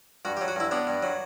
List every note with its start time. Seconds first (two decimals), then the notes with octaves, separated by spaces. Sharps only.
0.25 G2 F#4
0.37 G4
0.41 F#3
0.48 F#4
0.56 G2 E4
0.71 B3 D4
0.87 G2
1.03 F#3